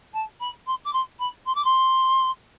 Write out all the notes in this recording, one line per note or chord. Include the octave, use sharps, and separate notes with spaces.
A5
B5
C6
D6
C6
B5
C6
D6
C6